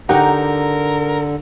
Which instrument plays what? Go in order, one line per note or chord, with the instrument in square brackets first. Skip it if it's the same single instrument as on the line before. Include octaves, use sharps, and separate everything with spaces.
[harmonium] D3 [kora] D#4 G4 [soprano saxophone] A#4 [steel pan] F#5 G5 A#5